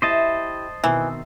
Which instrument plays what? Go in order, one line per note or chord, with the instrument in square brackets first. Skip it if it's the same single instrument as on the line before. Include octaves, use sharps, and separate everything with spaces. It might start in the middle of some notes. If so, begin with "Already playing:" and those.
[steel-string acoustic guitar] E4 G4 [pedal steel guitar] C5 D#5 A5
[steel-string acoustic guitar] B2 D#3 C4 [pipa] E3